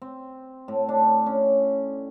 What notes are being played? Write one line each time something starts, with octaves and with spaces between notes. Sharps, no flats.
C4
A2
D4
C#4